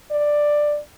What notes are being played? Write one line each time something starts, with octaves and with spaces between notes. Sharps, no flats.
D5